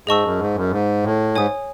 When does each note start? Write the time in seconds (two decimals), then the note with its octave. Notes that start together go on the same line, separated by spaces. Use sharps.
0.07 G#2 G#4 D#5 A5 C#6 E6
0.23 F#2
0.39 G#2
0.55 F#2
0.71 G#2
1.03 A2
1.34 G#2 C#5 G#5 D#6